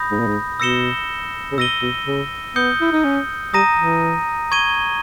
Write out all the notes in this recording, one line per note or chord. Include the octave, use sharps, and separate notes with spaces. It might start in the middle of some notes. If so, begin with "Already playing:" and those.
Already playing: B5 D#6 G6 A#6
G#2
A#2
G#2
B2 E6 A#6 C#7 E7 G7
C#3
B2 E6 A#6 D#7 G7
B2
C#3
B3 D#6 G6 C#7 G7
E4
D#4
C#4
G3 A#5 D#6 A#6 D#7
E3
C#6 G#6 D#7 G7